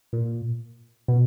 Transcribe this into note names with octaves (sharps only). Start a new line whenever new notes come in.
A#2
B2